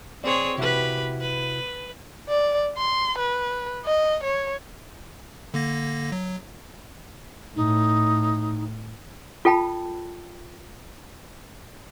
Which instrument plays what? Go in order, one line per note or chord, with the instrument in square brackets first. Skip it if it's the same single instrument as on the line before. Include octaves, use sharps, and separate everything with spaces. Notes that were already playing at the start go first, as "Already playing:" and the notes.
[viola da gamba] C4 G#4 C#5 [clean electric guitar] D5 C6
[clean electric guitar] C3 E4 F#4 [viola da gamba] G4 B4
[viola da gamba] B4
[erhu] D5
C6
B4
D#5
C#5
[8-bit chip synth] D3 A#3 A#6
F#3
[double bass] A2 [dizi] D#4
[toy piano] F4 A4 G5 A5 B5